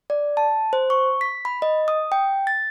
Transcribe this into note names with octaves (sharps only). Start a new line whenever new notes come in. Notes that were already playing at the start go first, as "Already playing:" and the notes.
D5
A5
C5
C#6
B6
B5
D#5
D#6
G5
A6